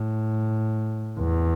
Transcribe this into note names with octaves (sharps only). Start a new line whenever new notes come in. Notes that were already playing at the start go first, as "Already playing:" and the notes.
Already playing: A2
E2